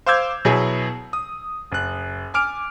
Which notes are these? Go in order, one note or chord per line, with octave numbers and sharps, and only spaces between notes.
C5 F5 D6 E6 G6 G#6
B2 F#3 B3 E4 G#4
D#6
F#1 F#6
G#5 D6 F6 D7